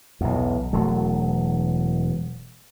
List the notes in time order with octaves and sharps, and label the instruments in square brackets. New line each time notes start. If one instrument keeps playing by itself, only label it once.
[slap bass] B1 E2
E1 F#3 A3